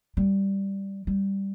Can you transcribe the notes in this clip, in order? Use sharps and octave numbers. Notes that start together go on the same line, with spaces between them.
G3
G3